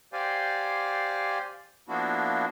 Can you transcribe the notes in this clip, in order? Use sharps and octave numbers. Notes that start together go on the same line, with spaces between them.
G4 C5 D5 F5 G#5
F3 A#3 B3 D4 E4 F#4